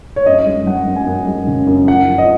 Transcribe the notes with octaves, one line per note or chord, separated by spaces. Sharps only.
C#5
F#2 D#5
G#3
G#3 F#5
F#2
G#5
F#2 F#5
G#3
C#3
F#2
F3 F#5
F3
D#5